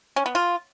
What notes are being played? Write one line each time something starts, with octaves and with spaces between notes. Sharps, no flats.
C#4
B3
F4